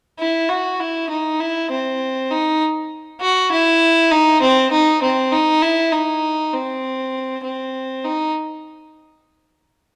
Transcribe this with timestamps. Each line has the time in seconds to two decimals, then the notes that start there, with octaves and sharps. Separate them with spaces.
0.19 E4
0.49 F#4
0.80 E4
1.10 D#4
1.40 E4
1.70 C4
2.31 D#4
3.21 F#4
3.52 E4
4.11 D#4
4.41 C4
4.72 D#4
5.03 C4
5.32 D#4
5.62 E4
5.93 D#4
6.53 C4
7.44 C4
8.05 D#4